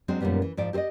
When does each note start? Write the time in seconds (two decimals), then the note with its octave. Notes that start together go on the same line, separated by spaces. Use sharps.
0.08 F#3 G#3 C4 D4
0.21 F#2 A#2 D#3 G3 B3
0.42 E3
0.57 G#2 F3 D5
0.73 G4 A4 C5 D5 D#5